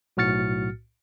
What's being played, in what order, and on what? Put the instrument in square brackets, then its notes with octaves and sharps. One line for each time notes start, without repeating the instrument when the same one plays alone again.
[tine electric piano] B1 A2 F#4 F6 A6 C#7